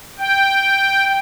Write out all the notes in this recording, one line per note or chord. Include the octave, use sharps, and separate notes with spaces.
G5